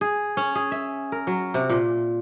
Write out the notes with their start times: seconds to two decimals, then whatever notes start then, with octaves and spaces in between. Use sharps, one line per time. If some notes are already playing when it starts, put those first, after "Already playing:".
0.01 G#4
0.37 C#4
0.55 G#4
0.72 E5
1.12 A#4
1.27 F#3
1.54 C3
1.70 A#2